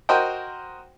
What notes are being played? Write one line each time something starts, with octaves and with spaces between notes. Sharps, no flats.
F#4 A#4 C5 D#5 G5